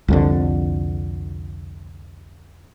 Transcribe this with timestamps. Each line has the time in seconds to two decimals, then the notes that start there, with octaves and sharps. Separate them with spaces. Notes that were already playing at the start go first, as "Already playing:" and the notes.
0.08 C2 F2 D3